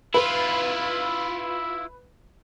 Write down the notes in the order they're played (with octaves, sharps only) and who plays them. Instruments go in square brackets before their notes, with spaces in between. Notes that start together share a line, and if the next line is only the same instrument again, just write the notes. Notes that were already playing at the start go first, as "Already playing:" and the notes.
[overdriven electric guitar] E4 F4 [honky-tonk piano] B4